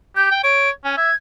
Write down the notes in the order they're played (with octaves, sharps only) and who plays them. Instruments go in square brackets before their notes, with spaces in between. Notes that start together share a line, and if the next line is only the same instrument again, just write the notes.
[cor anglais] G4 [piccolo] G6
[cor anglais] G5
[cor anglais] C#5 [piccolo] D7
[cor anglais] C#4 [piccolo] G#5
[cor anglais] E5 [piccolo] G#6